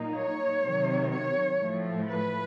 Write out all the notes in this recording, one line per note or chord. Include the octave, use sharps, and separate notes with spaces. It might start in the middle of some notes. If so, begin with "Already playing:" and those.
Already playing: A#2 F#3 A#3 D#4
C#5
C3 D#3 F#3
C#5
A2 F3 A3
B4